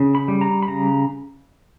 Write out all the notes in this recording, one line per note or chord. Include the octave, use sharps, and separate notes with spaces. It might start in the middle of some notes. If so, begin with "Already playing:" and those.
Already playing: C#3
B5
G3
A#5
B5
C#3 A#5